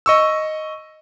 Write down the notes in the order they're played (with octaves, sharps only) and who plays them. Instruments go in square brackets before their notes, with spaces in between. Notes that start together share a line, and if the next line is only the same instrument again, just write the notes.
[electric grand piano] D#5 C#6 E6